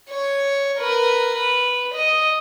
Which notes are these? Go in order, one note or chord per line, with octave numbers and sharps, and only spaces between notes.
C#5
A#4 B4
B4
D#5